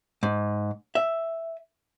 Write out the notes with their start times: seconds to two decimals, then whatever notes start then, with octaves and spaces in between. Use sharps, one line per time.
0.23 G#2
0.95 E5